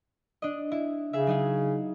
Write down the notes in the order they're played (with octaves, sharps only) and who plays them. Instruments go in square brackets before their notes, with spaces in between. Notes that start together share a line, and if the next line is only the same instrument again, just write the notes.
[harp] D4 D#5
E4
[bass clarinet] C#3 [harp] G#4 E5
[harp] F#3 D#4 G#4